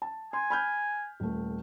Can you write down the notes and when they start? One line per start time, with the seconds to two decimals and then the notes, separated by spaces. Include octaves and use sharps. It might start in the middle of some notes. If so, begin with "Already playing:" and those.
0.02 A5
0.33 G#5 C6
0.50 B5 F6 G6
1.20 D#1 A3